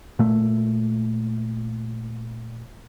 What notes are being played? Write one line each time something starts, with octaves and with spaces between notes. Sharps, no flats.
A#2 A3